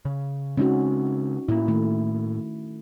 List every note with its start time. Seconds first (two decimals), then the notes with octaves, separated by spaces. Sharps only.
0.05 C#3
0.57 C#3 G#3 C4 C#4 D#4 F#4
1.48 A2 A#3 E4
1.68 D#3 A3